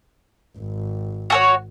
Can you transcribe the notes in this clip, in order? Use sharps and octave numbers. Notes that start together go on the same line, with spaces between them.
G#1
F#4 A4 C#5